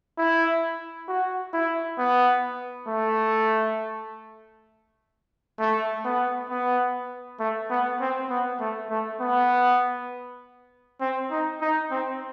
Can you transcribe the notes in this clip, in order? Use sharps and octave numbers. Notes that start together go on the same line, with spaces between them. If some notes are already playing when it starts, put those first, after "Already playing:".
E4
F#4
E4
B3
A3
A3
B3
B3
A3
B3
C4
B3
A3
A3
B3
C4
D#4
D#4
C4